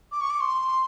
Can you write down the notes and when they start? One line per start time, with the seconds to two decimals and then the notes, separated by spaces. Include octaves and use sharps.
0.12 D6
0.21 C#6
0.30 D6
0.40 C6